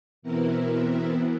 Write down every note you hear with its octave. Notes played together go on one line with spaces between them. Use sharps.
B2 E3 B3 C4 E4 A#4